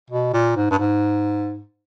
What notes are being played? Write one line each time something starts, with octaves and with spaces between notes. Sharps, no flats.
B2
A#2
G#2
G2
G#2